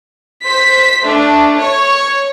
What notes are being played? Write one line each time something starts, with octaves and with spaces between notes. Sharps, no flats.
C5 B6
A3 D4
C#5